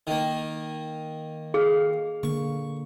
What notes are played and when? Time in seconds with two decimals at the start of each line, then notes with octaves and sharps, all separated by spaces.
0.07 D#3 A#3
1.54 G#4 F5
2.23 D3 A#3 C#6